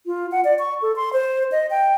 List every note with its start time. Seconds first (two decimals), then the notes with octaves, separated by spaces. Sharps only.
0.06 F4
0.32 F#5
0.45 D5
0.59 C#6
0.82 A4
0.96 C6
1.13 C5
1.52 D#5
1.70 G5